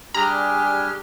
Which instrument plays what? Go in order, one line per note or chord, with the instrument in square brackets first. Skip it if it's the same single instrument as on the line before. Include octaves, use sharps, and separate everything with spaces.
[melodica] G3 G#4 G#5 [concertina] D4 F6 [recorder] G4 [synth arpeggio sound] A#5